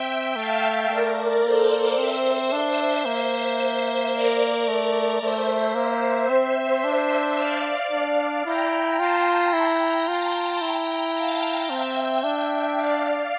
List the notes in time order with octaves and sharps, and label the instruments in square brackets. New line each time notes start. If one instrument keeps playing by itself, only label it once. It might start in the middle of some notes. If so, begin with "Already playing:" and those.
Already playing: [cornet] C4 [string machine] E5 G5
[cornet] A3 [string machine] F5 A5
[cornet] A3 [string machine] A#4 D5
[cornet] A#3 [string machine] A4 C5
[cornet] C4 [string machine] C5 E5
[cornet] D4
A#3
[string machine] C5 E5
A#4 D5
[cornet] A3 [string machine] A#4 D5
[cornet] A3 [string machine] C5 E5
[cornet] A#3 [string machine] C5 E5
[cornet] C4
D4
[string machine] D5 F5
[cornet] D4
[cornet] E4 [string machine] G5 A#5
[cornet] F4 [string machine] A5 C6
[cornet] E4 [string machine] G5 A#5
[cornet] F4 [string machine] A5 C6
[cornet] E4 [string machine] G5 A#5
[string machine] F5 A5
[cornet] C4 [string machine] E5 G5
[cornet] D4
[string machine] D5 F5